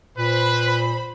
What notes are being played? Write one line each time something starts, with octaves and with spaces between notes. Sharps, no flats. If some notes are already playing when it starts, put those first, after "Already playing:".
A#2 B4 C5 B5